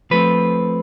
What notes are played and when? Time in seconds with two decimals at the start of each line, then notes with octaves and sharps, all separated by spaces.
0.11 F3 A3 C4 B4